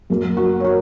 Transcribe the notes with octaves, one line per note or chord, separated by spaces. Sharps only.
F#2 F#3 A#3
F#4 A#4
C#5
F#4 A#4